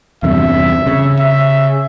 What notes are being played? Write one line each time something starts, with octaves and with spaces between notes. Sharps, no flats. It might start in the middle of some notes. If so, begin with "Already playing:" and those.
E2 G2 C3 E5
C#3
E5